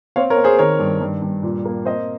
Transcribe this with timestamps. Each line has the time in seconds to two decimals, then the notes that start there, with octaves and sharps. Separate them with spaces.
0.16 C4 C#5 F5
0.30 A#4 C#5
0.37 C4
0.44 G#4 C5
0.58 D#3 A#4 C#5
0.79 G2
1.01 G2
1.22 G2
1.43 A#2
1.65 A#3
1.85 C4 C5 D#5